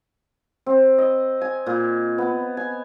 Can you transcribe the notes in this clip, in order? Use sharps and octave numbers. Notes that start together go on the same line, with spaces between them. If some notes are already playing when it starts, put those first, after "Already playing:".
C4
D#5
G#5
A#2
B3
G#5